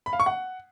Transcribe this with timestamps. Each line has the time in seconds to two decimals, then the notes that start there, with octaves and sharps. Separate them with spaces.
0.06 B5
0.13 F5
0.20 C#6
0.26 F#5